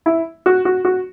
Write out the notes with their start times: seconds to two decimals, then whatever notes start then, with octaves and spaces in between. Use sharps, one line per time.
0.06 E4
0.46 F#4
0.65 F#4
0.85 F#4